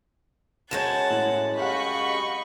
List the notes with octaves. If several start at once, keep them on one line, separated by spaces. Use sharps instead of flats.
F#2 G#3 C#5 F#5 A5 G6 G#6 E7
A2
G4 D#5 F5 F#5 B5 C#6